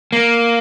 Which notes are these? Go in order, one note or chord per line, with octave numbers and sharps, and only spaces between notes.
A#3